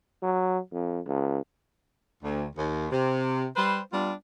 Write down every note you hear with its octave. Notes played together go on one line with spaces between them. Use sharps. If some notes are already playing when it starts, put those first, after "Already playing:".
F#3
F2
C#2
D2
D#2
C3
G3 B4 C5
G3 B3 D4 F4